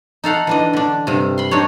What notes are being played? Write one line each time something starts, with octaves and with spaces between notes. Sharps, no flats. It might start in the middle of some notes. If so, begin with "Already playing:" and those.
D#4 A4 F5 F#5
E3 D4 D#5
D3 D4
G2 C3
B5 C6
C4 D4 D#4 C#5